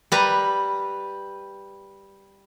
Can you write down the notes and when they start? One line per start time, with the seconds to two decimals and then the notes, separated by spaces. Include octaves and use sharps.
0.12 G3 B4 A#5